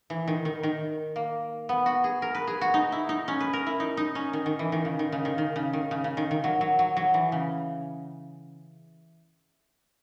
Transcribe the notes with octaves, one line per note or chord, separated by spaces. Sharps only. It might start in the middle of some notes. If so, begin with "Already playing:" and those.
E3
D#3
D#3
D#3
A#3
B3
F#4
G#4
A#4
B4
G#4
F#4
D#4
E4
D#4
C#4
B4
A#4
E4
D#4
D#4
C#4
D#3
D#3
E3
D#3
C#3
D#3
C#3
D#3
D#3
C#3
D#3
C#3
C#3
D#3
D#3
F#3
F#3
F#3
F#3
E3
C#3